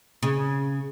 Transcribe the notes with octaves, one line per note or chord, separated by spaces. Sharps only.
C#3